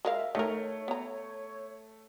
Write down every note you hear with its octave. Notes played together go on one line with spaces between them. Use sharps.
G#3 A#4 E5 F5
D#3 A3 A#4 C#5
B3 A#5